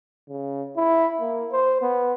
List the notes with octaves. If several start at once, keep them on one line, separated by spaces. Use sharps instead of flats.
C#3
E4
A#3
C5
B3